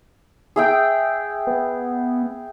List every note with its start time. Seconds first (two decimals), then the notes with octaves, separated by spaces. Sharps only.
0.56 G#4 E5 G5
1.47 B3